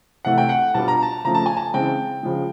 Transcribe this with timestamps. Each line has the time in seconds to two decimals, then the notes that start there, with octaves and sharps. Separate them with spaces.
0.25 C3 E3 A3 F#5
0.38 G5
0.49 F#5
0.74 B2 G3 B3 D4 F4 A5
0.88 A#5
1.02 A5
1.25 C#3 F3 A3 A#5
1.34 A5
1.46 G#5
1.57 A5
1.74 C#3 E3 G#3 C4 G5
2.23 C#3 F3 G#3